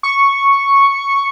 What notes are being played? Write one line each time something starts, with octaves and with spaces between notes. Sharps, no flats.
C#6